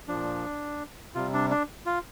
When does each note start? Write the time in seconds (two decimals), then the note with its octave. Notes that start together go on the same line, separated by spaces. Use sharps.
0.08 A#2 F3 D4
1.15 C3 G3 F4
1.33 D4
1.50 D4
1.86 F4